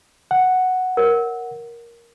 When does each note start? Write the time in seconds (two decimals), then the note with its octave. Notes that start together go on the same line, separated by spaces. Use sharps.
0.31 F#5
0.97 A#4 C#5